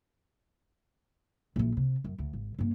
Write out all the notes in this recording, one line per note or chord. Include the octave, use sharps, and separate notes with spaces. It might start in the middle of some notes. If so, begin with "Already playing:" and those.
A#1 E3
C3
F#2
D2
G#1
G2 A#3